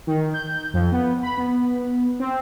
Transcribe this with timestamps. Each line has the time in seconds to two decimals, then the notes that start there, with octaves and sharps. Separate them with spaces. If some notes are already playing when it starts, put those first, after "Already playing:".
0.07 D#3
0.34 G6
0.74 F2
0.92 B3
1.23 B5
1.37 B3
2.20 C4